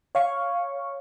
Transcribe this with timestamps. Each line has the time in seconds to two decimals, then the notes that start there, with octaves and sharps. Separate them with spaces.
0.15 C#5 F5 C#6